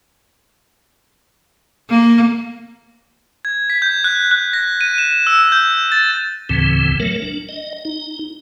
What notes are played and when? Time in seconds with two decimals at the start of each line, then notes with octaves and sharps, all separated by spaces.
1.90 A#3
3.45 G#6
3.70 B6
3.82 G6
4.04 F#6
4.31 F#6
4.53 A#6
4.81 D#7
4.98 E7
5.27 E6
5.52 G6
5.92 A6
6.49 D2 A2 C#3 E3 C4
7.00 F#3 A3 A#4
7.22 D4
7.49 D#5
7.85 D#4